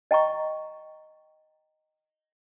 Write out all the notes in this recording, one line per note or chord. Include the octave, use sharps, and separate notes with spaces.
D#5 G5 A#5 C#6